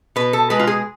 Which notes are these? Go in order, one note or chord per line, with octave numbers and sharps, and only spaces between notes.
B2 B4
A4
G#3 B4
F4
G#4